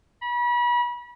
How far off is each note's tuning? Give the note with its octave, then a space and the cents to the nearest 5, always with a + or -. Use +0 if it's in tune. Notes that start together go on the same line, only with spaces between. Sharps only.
B5 -35